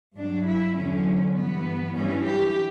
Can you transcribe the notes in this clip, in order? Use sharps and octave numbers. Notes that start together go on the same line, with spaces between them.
G2 F#3 D4
E4
E2 D3 F#3 C#4
G2 E3 B3
G2 E3 C#4
G4